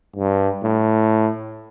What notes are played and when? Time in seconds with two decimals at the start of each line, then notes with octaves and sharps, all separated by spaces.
0.16 G2
0.64 A2